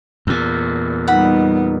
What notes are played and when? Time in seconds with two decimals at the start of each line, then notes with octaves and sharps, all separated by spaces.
0.27 E2 A#2
1.08 G3 B3 D#4 F#5 B5